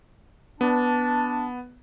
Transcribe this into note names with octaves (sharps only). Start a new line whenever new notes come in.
B3 D4 A5